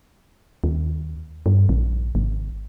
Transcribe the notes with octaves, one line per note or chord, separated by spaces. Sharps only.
D#2
G2
A#1
G#1